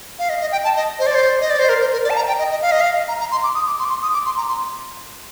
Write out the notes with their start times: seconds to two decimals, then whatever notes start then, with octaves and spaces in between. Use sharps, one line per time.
0.19 F5
0.29 D#5
0.41 D#5
0.52 G5
0.64 A5
0.76 D#5
0.99 C5
1.07 D5
1.15 C5
1.41 D#5
1.50 D5
1.59 C5
1.69 A#4
1.81 C5
1.93 A#4
2.04 D5
2.10 A5
2.16 A#5
2.28 G5
2.39 D#5
2.51 D#5
2.62 F5
2.72 D#5
2.81 F5
3.08 A#5
3.20 A#5
3.32 C6
3.44 D6
3.55 D#6
3.67 D6
3.79 C6
3.85 D6
3.90 C6
4.02 D#6
4.14 D6
4.26 C6
4.37 A#5
4.48 C6